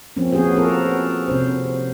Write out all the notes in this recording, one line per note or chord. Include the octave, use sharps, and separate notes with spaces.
F3 A#3 C4 C#4
F3 B3 C#4 F#4 G#4 C5
F3 F#4 A4 A#4
C3 C#4 C5